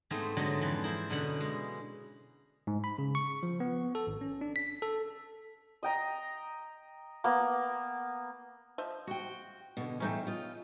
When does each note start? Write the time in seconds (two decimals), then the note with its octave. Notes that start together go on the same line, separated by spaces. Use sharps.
0.11 G#2 A3 B3 C4 G#4
0.37 G#2 D3 F#3 G#3 B3
0.61 F2 E3
0.84 E4 G#4 A#4 C5
1.10 F#2 B2 D3 C#5 F#5 B5
1.40 G#3
2.67 G#2
2.84 B5
2.98 C#3
3.15 C#6
3.43 F3
3.60 B3
3.95 A4
4.07 G#1
4.21 C#4
4.41 D4
4.56 B6
4.82 A4
5.83 D#5 G5 A#5
7.24 A#3 B3
8.78 F3 D#5 E5
9.07 F#4 G5
9.77 B2 D3
10.00 E2 A2 A3 C#4 D#4 G5
10.27 F4 D#5